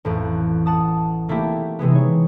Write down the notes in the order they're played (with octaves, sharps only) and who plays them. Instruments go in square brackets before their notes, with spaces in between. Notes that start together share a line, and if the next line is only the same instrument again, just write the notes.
[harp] A1 F2 A2
F#5 A5 D#6
F#3 A3 A#3 C4 E4 G4
C3 E3 G#3 B3
D#4 C#5